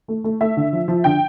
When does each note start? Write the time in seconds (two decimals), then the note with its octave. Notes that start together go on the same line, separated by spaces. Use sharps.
0.08 A3
0.24 A3
0.41 A3 E5
0.57 D3
0.73 F3
0.88 F3
1.04 D3 G5